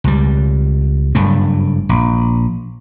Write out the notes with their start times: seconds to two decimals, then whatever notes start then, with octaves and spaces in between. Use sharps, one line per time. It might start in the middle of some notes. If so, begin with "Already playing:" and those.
0.04 C#2 G3
1.15 F#1 G2 A3
1.89 A#1